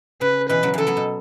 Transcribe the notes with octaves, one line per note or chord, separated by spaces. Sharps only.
C#3 B4
B2 E3 B4
C#3 F#3
C#3 E3 F#3 A4
F#3 B3
B2